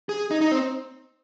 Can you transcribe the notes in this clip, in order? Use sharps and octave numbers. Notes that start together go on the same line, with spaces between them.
G#4
D#4
D#4
C4